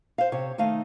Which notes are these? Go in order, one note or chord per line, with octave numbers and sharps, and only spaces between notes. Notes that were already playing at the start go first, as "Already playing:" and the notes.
C5 F5
C3 C#5
D#3 A3 D#4 F5